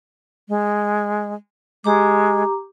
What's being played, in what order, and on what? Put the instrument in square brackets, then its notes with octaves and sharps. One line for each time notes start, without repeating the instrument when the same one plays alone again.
[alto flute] G#3
[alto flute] G#3 [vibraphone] G4 A#5 D6